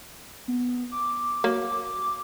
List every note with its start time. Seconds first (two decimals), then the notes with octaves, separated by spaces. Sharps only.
0.48 B3
0.92 D6
1.44 F#3 A#3